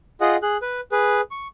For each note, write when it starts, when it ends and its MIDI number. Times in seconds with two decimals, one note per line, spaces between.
0.21 0.36 65
0.21 0.36 68
0.21 0.36 75
0.21 0.36 78
0.42 0.57 68
0.42 0.57 90
0.62 0.81 71
0.92 1.21 68
0.92 1.21 71
1.31 1.48 85